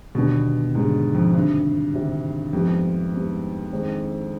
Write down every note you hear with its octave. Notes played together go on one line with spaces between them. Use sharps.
D#2 B2 D3 G3 B3 D4
D#2 G#2 D3 G3 B3 D4
F2
D2 G2 C3 D#3
D2 C3 D#3
F2 G#2 G3 B3
G#2 G3 B3
D#3 G#3 C4 D#4